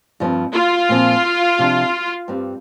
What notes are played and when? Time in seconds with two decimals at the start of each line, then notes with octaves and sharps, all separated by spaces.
0.20 G2 F3 C4
0.55 F4
0.89 A#2 F3 C4
1.59 C3 F3 D4
2.28 G2 G3 C4